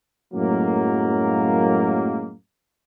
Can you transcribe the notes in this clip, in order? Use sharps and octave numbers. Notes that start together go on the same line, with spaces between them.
F#2 A2 F#3 G#3 A#3